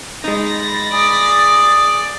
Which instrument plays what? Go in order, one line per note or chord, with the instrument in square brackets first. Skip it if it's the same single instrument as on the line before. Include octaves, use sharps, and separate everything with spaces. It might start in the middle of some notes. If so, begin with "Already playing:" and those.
[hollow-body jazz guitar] G#3 D#4 [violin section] B5 A6 A#6
[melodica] G#4 [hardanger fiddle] D5